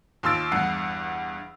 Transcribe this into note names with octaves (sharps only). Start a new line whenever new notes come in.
D#2 F4 C6 E6 A6 D7
E2 G2 F#5 C7